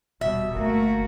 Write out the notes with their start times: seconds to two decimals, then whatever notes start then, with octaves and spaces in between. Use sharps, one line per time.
0.21 D#1 B2 G3 E5
0.54 G1 D2 A3 A#3 F#4